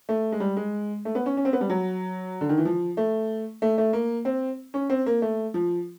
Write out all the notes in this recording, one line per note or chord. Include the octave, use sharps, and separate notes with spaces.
A3
G#3
G3
G#3
A3
B3
C#4
C#4
C4
B3
G3
F#3
D3
D#3
E3
F3
A3
A3
A3
A#3
C4
C#4
C4
A#3
A3
F3